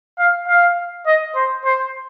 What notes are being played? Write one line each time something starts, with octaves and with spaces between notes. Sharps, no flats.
F5
F5
D#5
C5
C5